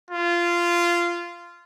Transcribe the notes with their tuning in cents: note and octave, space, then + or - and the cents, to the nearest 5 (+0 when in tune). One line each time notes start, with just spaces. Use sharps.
F4 -15